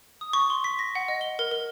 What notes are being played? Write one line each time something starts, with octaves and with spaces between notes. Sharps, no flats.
D#6
C#6
C6
B6
A#6
F#5
D#5
G7
A#4
A#4